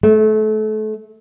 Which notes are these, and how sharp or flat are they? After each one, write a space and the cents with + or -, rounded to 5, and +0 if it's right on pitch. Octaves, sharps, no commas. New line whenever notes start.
A3 -30